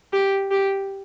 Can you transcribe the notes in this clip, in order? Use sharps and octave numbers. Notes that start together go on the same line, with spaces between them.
G4
G4